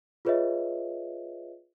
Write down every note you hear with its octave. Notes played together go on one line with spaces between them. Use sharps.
F4 G#4 B4 C#5 D#5 E5